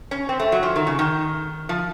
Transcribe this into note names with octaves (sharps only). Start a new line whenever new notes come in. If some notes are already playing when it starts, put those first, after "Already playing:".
C#4
C4
A3
F#3
F3
D#3
C#3
D#3
F3